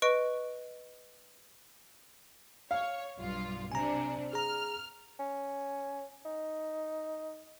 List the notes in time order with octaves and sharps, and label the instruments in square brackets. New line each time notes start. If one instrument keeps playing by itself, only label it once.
[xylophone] B4 D#5 C#6 D7
[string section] C#5 [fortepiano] F5
[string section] B1 G2 F4
[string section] C3 D4 [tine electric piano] G#5 A#5
[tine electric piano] G#4 A#5 [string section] F6
[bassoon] C#4
D#4